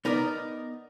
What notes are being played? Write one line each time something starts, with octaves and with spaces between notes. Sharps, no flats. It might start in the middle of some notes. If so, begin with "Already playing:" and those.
B3 D#4 A#4 D5